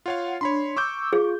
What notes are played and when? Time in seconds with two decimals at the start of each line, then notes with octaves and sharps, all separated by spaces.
0.06 F4 C#5 F5 F#5
0.41 D4 C#5 B5 C6
0.77 C#6 D6 E6 G6
1.13 F4 G#4